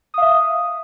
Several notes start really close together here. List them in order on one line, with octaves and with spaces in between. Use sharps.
D#6 F5 E5